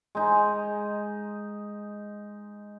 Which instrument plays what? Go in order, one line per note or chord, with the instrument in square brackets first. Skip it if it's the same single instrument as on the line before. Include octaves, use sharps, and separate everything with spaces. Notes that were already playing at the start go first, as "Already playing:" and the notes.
[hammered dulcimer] G#3 D#4